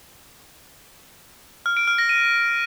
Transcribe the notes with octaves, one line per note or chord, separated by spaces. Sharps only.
F6
D7
F6
A#6
D#7